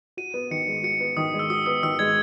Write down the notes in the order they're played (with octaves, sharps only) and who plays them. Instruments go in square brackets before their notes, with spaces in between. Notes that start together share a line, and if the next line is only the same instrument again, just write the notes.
[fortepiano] F#4 [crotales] D#7
[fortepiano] B3
[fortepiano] D#3 [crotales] C#7
[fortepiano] G#3
[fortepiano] F#4 [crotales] C#7
[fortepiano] B3
[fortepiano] D#3 [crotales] D#6
[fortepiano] G#3
[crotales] E6
[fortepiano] F#4 [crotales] D#6
[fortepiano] B3 [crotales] D#6
[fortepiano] D#3 [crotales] E6
[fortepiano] G#3 [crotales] G#6